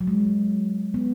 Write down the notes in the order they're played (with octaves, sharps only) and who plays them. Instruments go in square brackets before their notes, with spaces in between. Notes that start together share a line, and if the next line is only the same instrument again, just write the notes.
[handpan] F#3
G#3
B3